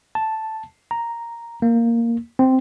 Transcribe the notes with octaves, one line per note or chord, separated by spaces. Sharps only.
A5
A#5
A#3
C4